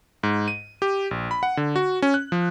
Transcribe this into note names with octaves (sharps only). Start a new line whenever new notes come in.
G#2
D#7
G4
A#1
B5
F#5
D3
F#4
C#4
F#6
F3